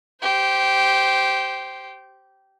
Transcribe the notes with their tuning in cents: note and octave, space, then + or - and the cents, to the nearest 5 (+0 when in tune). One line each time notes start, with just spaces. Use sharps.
G4 -15 C5 +0